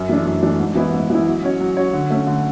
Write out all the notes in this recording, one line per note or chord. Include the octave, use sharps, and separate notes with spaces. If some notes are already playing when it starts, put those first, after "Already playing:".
Already playing: F#2
E3 A3 D4
F#2
E3 A3 D4
G#2
E3 B3 E4
G#2
E3 B3 E4
F#3
C#4 F#4 C#5
F#3
C#4 F#4 C#5
D3
A3 C#4
D3